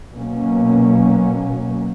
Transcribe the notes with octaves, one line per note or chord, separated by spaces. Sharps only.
B2 F#3 A#3 C#4